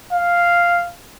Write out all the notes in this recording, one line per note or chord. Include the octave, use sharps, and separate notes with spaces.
F5